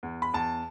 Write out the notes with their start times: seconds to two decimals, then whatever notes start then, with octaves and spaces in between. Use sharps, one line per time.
0.03 E2
0.22 B5
0.33 E2 A5